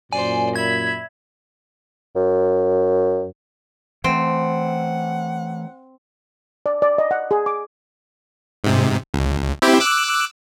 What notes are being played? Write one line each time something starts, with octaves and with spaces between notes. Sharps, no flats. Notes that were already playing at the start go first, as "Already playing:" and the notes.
F#2 A#2 C5 D5 G#5
E5 B5 G#6
F#2
E3 A3 C4 F#5
D5
D5
D#5
F#5
G#4
D6
G#2 C3
C#2
C4 E4 G4
D6 E6 F#6